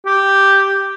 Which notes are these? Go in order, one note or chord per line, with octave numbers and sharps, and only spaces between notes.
G4